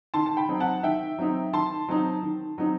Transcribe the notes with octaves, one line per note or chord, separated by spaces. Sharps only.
D#3 A5 C6
A5
G5 B5
F#3 C4 D#4
F#5 A5
D#3 E5 G5
F#3 C4 D#4
D#3 A5 C6
F#3 C4 D#4
D#3
F#3 C4 D#4